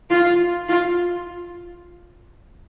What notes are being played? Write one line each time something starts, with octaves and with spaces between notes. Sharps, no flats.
F4
F4